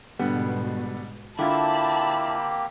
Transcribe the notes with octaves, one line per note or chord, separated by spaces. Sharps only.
G#2 B2 D3 G3 B3
D3 A#3 C4 E4 F4 G4 A5 B5